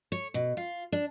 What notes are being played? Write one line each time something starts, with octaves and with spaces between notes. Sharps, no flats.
C#5
B2
F4
D4